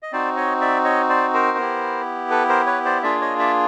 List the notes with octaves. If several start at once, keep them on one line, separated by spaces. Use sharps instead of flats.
D#5
C4 D#4 F#4 C5 D5
C#5 D#5
D5 E5
C#5 D#5
C5 D5
A#4 C5
B3 E4 G4
A4 B4
A#4 C5
B4 C#5
C5 D5
A#3 D4 F4 G#4 D5 E5
C#5 D#5
D5 E5